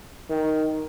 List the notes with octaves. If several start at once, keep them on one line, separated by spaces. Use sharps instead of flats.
D#3